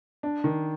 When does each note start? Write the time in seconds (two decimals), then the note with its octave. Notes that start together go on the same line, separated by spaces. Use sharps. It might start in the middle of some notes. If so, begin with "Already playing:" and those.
0.23 D4
0.44 D#3